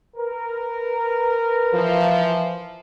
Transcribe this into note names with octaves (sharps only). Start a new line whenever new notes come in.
A#4 B4
E3 F3